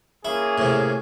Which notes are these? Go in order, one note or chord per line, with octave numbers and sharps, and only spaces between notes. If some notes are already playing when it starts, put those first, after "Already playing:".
A#3 C#4 E4 G#4
A2 C3